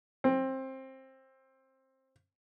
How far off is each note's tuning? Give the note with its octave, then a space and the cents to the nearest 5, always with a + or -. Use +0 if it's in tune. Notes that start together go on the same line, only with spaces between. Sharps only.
C4 +20